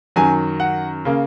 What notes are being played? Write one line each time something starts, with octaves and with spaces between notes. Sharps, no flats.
F#2 D#3 F#3 G#5
F#5
C#3 A#3